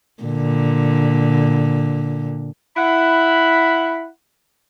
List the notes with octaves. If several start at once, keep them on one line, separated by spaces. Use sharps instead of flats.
A#2 D3
E4 F#5 B5